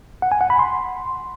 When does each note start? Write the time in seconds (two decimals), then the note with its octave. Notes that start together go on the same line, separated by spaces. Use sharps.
0.22 F#5
0.32 G#5
0.41 F#5
0.50 B5
0.59 C6